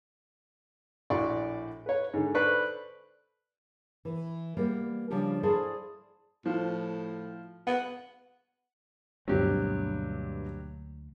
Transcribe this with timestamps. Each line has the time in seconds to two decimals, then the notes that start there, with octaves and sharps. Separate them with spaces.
1.10 A#1 A2 F#4 D5 C6 C#6
1.86 B4 C#5
2.14 G#2 D3
2.35 A4 B4 C5 D5 B5 C#6
4.05 E3
4.57 G3 A#3 B3
5.10 C#3 F3 G3 D4 G4
5.43 E4 G#4 A4 C5 D5 F5
6.46 A2 F3
7.67 B3 F#5
9.28 D2 G2 B2 F#3 A#3 C4 G4